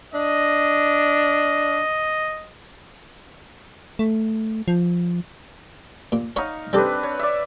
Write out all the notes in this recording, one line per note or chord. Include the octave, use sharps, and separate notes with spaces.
D4 D#5
A3
F3
A#2
D#4 C#5 F5 F#5 B5 C#6
G3 C4 D4 A4 B4
C#5
D5 E5